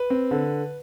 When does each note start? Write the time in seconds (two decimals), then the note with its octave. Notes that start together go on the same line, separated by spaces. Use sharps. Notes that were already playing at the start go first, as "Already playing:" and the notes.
Already playing: B4
0.10 C4
0.31 D3